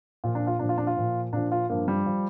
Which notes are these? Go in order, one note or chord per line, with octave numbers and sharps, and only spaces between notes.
A#2 F3 F4
D4
F4
A#2 F3 D4
F4
D4
F4
A#2 F3
A#2 F3 D4
F4
G2 F3 A#3
G3
F3